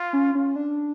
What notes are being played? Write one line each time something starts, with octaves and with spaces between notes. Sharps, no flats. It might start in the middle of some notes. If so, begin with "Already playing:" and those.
Already playing: F4
C#4
C#4
D4